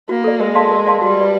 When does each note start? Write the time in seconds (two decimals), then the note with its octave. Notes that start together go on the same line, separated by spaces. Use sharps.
0.09 A#3 F#4
0.24 A4 D5
0.40 G#3 A#4
0.55 D5 F5 A5 C6
0.71 A#4
0.86 D5 F5 A5 C6
1.02 G3 F#4
1.17 B4 D5